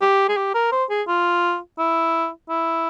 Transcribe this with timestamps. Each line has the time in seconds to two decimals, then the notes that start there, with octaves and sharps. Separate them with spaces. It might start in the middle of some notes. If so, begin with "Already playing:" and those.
0.01 G4
0.29 G#4
0.37 G4
0.55 A#4
0.72 C5
0.90 G#4
1.08 F4
1.78 E4
2.49 E4